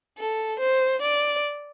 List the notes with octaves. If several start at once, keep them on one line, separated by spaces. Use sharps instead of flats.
A4
C5
D5